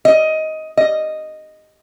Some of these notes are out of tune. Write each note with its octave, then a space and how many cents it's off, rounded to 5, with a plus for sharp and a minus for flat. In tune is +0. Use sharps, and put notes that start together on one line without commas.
D#5 +15
D#5 -5